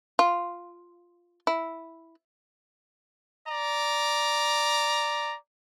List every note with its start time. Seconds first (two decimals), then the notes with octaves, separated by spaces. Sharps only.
0.19 F4
1.47 E4
3.46 D5 A#5